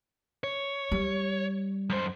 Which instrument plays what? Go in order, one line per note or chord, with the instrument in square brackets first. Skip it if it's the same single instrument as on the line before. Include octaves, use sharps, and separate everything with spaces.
[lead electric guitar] C#5
[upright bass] G3
[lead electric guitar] F#2 C5